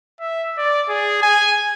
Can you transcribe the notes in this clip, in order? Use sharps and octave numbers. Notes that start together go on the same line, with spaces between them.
E5
D5
G#4
G#5